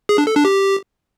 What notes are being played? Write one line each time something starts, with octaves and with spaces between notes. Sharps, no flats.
G#4
D4
A4
D4
G4